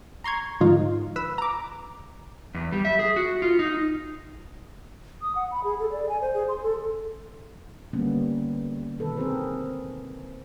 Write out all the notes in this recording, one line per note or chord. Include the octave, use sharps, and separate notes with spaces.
A#5 C6 C#6 G#6
G#2 D3 F3 D#4 F4
B4 B5 E6
A#5 D6
E2
G3
E5
G#4
F#4
F4
D#4
D#6
F#5
B5
G#4
A4
D5
G#5
C5
G#4
C6
A4
D3 G3 A#3 B3 C#4
B2 D#3 A4 B4
C4 G#4 A#4 C5